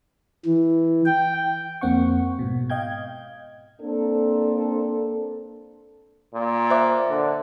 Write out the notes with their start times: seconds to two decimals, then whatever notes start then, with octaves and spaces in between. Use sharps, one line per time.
0.46 E3
1.06 G5
1.81 F2 A#3 C4 F#5 C#6
2.39 G#2 B2
2.70 D#5 F5 G5 G6 G#6
3.81 A#3 C4 D4 A4
6.34 A#2
6.70 C5 E5 D6
7.09 D3